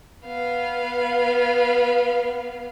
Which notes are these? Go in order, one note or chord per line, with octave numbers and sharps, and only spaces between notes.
B3 F5